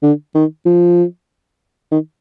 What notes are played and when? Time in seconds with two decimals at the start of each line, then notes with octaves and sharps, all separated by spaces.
0.03 D3
0.35 D#3
0.66 F3
1.91 D#3